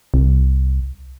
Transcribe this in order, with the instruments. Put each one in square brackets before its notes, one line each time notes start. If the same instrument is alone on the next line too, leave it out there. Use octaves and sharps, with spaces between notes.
[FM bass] C2